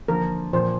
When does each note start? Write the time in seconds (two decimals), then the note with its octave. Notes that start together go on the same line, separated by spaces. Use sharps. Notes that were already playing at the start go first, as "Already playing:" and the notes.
0.08 D3 F3 A#3 F4 A#4
0.53 A#2 F3 A#3 C5